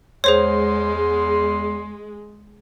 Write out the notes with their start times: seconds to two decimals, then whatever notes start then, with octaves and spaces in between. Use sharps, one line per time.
0.24 E2 G#3 G#4 C5 C#5 C6